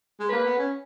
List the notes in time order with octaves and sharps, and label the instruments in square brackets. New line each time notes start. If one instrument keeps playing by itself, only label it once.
[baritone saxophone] G#3
[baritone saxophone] A#3 [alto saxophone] B4
[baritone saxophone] B3
C#4